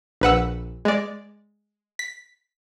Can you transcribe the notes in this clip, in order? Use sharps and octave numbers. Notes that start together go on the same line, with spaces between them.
A#1 B4 F#5 E6
G#3 D5
B6